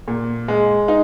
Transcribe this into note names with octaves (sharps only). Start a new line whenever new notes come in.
A#2
G#3
D#4